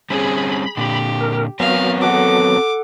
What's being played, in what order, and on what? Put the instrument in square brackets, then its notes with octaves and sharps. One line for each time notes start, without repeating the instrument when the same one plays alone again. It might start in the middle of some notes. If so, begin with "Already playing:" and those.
[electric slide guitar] G3 C4 C#4 [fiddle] G#4 [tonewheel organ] B5
[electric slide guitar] A#2 D3 [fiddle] G4
[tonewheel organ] A#4
[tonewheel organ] F#3 B3 [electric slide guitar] C4 F#4 A#4 [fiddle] F5
[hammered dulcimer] A4 F#5 [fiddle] D6